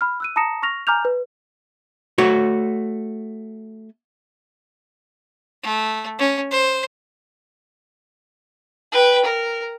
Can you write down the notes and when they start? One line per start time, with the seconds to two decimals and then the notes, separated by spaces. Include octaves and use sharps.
0.01 B5 F6
0.20 E6 F#6 D#7
0.36 A5 A#5 D#6 A#6 C#7 E7
0.62 C#6 F6 A#6 F7
0.87 G#5 A#5 D6 F6 G6 F7
1.05 B4
2.18 A3 F#4 C#5
5.63 A3
6.19 C#4
6.51 C5
8.92 B4 G5
9.25 A#4